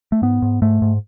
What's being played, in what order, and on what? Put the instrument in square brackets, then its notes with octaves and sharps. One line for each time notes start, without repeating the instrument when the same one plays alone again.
[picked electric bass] A3
G#2 B3
G#2
G#2 A3
G#2